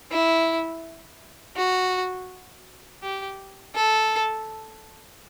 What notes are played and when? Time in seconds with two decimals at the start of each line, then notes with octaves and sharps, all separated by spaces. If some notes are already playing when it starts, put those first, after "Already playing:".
0.11 E4
1.57 F#4
3.02 G4
3.75 A4